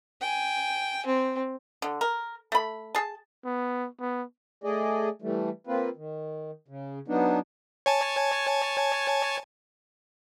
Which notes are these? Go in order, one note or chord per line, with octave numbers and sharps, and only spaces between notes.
G5 G#5
C4
D3
A#4
A3 B5
G#4 A5
B3
B3
A3 G#4 D5 D#5
E3 G3 A3
A#3 C4 F4 B4
D#3
C#3
F#3 B3 D4 D#4
C#5 G#5 A5